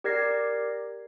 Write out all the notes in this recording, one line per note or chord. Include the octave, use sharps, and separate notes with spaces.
G4 A#4 D5 G#6 A#6 C7